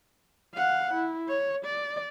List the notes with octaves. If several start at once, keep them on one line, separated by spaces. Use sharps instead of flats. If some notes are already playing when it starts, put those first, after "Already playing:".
F5 F#5
E4
C#5
D5